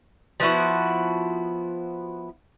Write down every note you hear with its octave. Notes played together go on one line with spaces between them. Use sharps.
F3 B3 E4 F#4